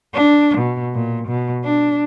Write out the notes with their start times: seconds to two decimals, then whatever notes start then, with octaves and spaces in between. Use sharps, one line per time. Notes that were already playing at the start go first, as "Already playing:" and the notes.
0.14 D4
0.57 B2
0.94 A#2
1.28 B2
1.64 D4